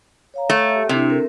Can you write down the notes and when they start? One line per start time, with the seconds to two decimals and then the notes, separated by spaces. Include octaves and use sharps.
0.34 C#5 F5 A#5
0.50 A3
0.75 G4
0.89 C3 D4 E4 C6
1.10 C4 A4 A#4